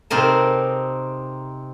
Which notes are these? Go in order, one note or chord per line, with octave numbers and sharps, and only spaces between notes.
C3 C4 D#4 A#4 G#5 A5